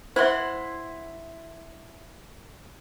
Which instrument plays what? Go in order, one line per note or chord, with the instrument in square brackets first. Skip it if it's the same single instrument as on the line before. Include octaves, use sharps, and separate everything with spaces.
[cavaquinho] E4 F#5 C6 [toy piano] C5 E5